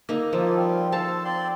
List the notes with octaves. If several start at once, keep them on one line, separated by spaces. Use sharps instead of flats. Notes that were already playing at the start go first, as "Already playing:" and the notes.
A#3 D#4 A4
F3 A#3 F4 A4
G3 C4 F4
A4 C5 F5 A5 E6
C4 D5 C6